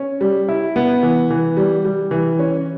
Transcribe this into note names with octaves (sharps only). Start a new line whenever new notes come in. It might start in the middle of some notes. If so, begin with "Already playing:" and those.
Already playing: C#4
G3
E4
B3
E3
E3
G3
G3
E3
C#4